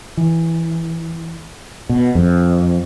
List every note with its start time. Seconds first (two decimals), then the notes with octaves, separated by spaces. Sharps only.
0.17 E3
1.89 B2
2.15 F2